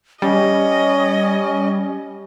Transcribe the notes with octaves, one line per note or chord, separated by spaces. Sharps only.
G3 C#4 D#5